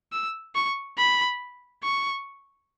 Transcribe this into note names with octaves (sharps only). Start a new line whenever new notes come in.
E6
C#6
B5
C#6